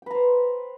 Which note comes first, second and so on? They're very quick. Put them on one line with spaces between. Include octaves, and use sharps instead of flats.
G5 B4 A#5 C5